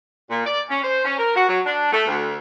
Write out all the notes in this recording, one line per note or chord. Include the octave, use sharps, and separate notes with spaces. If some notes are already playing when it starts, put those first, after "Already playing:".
A#2
D5
C#4
C5
C#4
A#4
F#4
F#3
D4
A3
D2